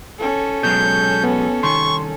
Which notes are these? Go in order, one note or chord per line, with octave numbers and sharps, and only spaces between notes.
C#4 A4
B2 F#3 G#3 G6
B3
C2 D#3 C6 C#6